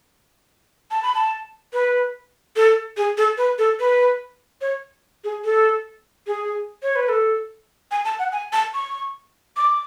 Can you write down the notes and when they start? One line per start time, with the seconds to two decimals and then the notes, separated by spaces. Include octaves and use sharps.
0.91 A5
1.03 B5
1.14 A5
1.73 B4
2.56 A4
2.97 G#4
3.18 A4
3.38 B4
3.58 A4
3.80 B4
4.61 C#5
5.24 G#4
5.44 A4
6.27 G#4
6.83 C#5
6.96 B4
7.09 A4
7.91 G#5
8.05 A5
8.19 F#5
8.32 G#5
8.53 A5
8.74 C#6
9.57 D6